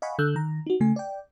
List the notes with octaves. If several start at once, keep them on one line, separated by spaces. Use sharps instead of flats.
D#5 F5 F#5 G#5 B5 C#6
D3 A4 E6 F#6 G6
D#3 A#5
D#4 F#4
C#3 A3 G#5
D5 G5